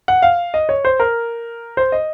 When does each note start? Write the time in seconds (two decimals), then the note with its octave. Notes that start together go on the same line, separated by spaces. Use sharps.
0.08 F#5
0.22 F5
0.54 D#5
0.69 C#5
0.85 C5
1.00 A#4
1.77 C5
1.92 D#5